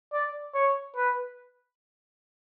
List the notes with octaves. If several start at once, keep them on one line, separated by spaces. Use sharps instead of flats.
D5
C#5
B4